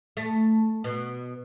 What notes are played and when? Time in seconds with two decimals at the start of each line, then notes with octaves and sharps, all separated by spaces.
0.17 A3
0.84 B2